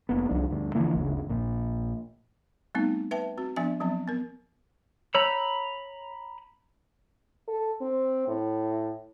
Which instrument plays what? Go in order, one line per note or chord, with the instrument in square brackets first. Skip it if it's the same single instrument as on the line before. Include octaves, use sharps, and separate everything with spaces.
[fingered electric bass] F1 A#3 B3
C2 F3 D4
D2 G2
D3 E3 F3 A#3
G1 D2 C#3
A#1 A#2
[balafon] G3 A3 B3 C4 D#4
B4 E5 G5 A5
C4 F#4
F3 B3 D4 E5 G#5
F3 F#3 B3 C4
B3 A#4
[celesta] C#5 [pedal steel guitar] A#5 B5 E6
[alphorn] A4
C4
A2